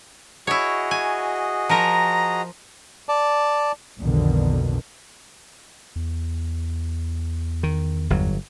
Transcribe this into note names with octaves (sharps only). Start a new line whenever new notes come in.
E4 F#4 G#4 C#5 D#5
G#5
F3 A#4 A#5
D5 A5
B1 F2 B2 D3 D#3
E2
D#3
G1 F#3